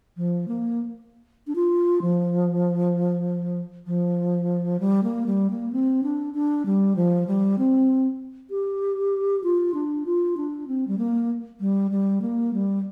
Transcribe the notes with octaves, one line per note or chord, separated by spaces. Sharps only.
F3
A#3
D4
F4
F3
F3
G3
A#3
G3
A#3
C4
D4
D4
G3
F3
G3
C4
G4
F4
D4
F4
D4
C4
G3
A#3
G3
G3
A#3
G3